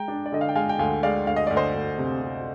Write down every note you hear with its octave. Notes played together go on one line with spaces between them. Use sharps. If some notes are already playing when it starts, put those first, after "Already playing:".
Already playing: G#3 G5 A#5
D4
D5
D3 D#5
F5
G5
G#3 F5 G#5
G5
D2 F5 G#5
G#3 D5 F5
D2 F5
D#5
D2 D5
C5 D#5
D2
C3
C3